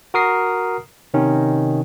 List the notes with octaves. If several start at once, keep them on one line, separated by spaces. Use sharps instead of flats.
F#4 A#4 D#6 C7
C3 D#3 C#4 D#4